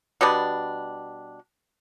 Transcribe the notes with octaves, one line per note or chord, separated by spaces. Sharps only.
B2 G3 B3 D4